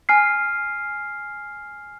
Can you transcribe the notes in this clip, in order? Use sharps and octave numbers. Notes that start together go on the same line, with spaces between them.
G#5 F6 C7